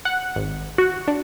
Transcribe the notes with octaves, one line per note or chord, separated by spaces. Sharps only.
F#5
G#1
F#4
D4